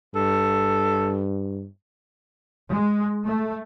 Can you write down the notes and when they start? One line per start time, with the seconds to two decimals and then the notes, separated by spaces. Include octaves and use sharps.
0.15 G2 A4
2.71 G#3
3.25 A3